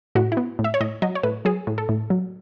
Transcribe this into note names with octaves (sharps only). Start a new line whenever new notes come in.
A2 F#4
E4
B3
A2
E5
C#5
A2 D#5
F#3 D#5
C#5
A2 B4
F#3 G#4
A2
A4
A2
F#3